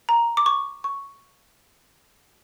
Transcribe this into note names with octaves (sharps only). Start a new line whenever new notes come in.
A#5
D6
C#6
C#6